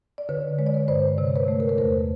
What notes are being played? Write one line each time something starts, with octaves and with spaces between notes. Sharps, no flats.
D5
D3 B4 C#5
G#3 C#5
D5
B4 C#5
G2 C5 D5
C3 C#5
C5
B4 C#5
A3
A#4
B4
E2 A#4 C5